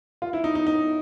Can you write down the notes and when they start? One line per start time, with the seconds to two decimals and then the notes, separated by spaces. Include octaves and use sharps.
0.22 F4
0.33 E4
0.44 D#4
0.55 D#4
0.67 D#4